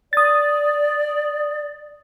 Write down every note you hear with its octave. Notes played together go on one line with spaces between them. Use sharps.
D5 D#6 A6